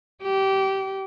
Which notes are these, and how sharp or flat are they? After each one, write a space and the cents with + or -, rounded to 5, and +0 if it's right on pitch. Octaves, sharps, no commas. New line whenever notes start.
G4 -20